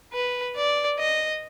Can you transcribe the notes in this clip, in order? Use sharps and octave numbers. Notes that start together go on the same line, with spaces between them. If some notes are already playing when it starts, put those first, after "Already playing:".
B4
D5
D#5